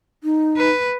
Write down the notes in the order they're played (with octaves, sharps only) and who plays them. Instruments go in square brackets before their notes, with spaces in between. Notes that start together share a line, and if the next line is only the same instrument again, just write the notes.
[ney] D#4
[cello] B4